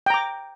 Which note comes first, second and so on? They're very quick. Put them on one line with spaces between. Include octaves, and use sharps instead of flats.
G5 A#5 D6